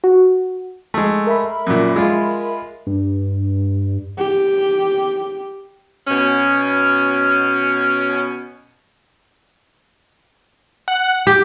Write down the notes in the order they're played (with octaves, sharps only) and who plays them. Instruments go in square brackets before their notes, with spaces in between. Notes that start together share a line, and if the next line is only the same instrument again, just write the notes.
[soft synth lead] F#4
[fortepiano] G#3 A3
[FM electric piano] A#4 E5 B5
[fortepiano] F#2 A#2
G#3 F4
[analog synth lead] G2
[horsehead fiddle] G4
[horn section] B2 C#4
[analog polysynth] F#5
[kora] G4